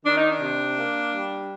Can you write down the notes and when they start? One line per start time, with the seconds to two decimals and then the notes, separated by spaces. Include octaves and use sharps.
0.05 D#3 D4
0.17 D#4
0.29 D4
0.41 C3
0.78 A#3
1.13 G3